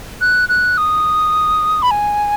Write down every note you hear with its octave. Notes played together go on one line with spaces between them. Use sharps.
F#6
F#6
D#6
B5
G#5